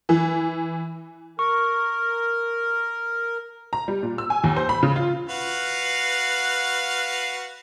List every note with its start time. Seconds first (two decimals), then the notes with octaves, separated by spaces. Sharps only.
0.09 E3
1.39 A#4 C#6
3.73 A#5
3.88 G3
4.03 A#2
4.18 E6
4.30 G#5
4.44 D#2
4.56 C5
4.69 B5
4.83 C#3
4.96 F4
5.29 F#4 B4 F5